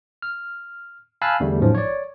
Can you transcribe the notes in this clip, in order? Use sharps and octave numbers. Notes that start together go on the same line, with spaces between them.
F6
F5 G#5 A5 B5 E6 F#6
E2 D3 G3 A3
A1 G#2 F3 F#3
C#5 D5